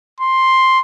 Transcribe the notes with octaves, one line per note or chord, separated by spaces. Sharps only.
C6